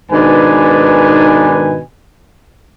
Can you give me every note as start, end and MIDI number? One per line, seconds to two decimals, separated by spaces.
0.12 1.81 44
0.12 1.81 47
0.12 1.81 51
0.12 1.81 62
0.12 1.81 71
0.12 1.81 80